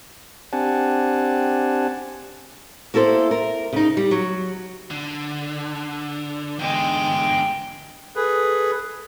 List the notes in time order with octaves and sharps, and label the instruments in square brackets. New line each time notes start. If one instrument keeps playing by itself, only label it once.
[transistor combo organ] C4 D4 G4 F#5 G#5 A5
[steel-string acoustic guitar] A#3 E4 A4 A#4 C5
A#4
C#3 D#4
G3
F#3
[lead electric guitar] D3
[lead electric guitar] E2 D3 [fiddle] G#3 G5
[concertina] G#4 B4 [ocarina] A4